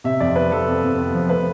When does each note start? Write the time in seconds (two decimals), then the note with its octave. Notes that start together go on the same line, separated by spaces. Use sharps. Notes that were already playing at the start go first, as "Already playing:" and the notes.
0.04 C3 E5
0.20 F2 D5
0.35 B3 B4
0.51 F3 A4
0.67 C3
0.83 F2
0.98 B3
1.14 F3
1.29 A3 B4